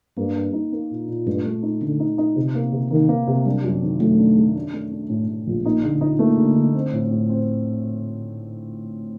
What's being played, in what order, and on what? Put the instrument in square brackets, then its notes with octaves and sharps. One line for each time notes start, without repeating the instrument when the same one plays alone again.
[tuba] G2 [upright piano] A#3
[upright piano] A#3
D#4
A#3
A#2
A#2
[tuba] G2 [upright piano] A3
[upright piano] A3
D#4
[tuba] D3 [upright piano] A3
[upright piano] D#4
D#4
C3
A#3
C3
[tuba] D#3 [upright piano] A#3
[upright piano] A#3
C3
[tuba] G3 [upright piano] D4
[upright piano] F#2
D#3
[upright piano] F#2 [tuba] A3
[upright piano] D4
G3
D4
A3
D4
A2
A2
A#1
[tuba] A#3 [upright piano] D#4
[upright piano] D3
D#4
[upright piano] A3 [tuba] A#3
[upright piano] D3
D3
C4
A2
A2
C4